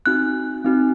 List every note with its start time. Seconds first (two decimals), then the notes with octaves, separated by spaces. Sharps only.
0.06 C4 D#4 F#4 F#6
0.64 C4 D#4 F#4